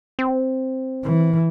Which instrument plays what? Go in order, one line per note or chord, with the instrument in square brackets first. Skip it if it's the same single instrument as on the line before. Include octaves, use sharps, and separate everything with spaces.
[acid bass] C4
[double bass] E3